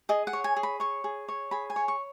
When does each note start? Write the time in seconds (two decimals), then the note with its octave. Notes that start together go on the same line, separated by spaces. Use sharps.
0.09 G#4 D#5
0.27 F#5
0.33 C#5
0.44 G#5
0.56 G#4
0.63 B5
0.80 C#5 C#6
1.04 G#4
1.28 C#5
1.51 G#4 B5
1.70 G#5
1.76 C#5
1.88 C#6